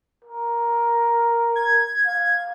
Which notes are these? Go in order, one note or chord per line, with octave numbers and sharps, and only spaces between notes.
A#4
G#6
F5